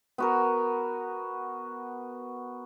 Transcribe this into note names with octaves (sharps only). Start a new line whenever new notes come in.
B3 F#4 A#4